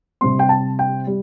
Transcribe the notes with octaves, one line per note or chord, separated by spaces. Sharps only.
C3 G3 C4 C6
G5
A5
G5
G3